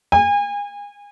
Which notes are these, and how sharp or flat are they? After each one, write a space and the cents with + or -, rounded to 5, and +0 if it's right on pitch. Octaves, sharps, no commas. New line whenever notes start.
G#5 -35